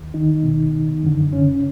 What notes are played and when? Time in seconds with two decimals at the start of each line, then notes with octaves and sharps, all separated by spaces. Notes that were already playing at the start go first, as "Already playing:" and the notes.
Already playing: D#2
0.14 D#3 D#4
0.43 C2 B2
1.03 F#2 D3
1.33 C#3 C#4